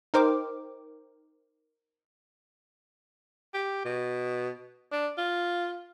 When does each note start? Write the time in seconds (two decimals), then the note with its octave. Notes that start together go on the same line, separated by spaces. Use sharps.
0.14 D#4 A#4 C5 G5 D6
3.54 G4
3.85 B2
4.92 D4
5.18 F4